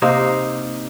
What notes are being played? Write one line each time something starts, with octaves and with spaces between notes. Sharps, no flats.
C3 A#3 D#4 C5